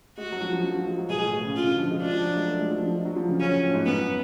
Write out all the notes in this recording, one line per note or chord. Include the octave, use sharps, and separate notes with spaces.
G#3 F#4
F#3
F3
F3
F3
F3
G#3
F#3
B2 G#4
A2
B2
C#3
D3 F4
D3
F3
G#3
D4
F3
F#3
G#3
A3
G#3
F3
F3
F#3
F3
C#3
C#3 C#4
C#3
A2
G#2
F#2 B3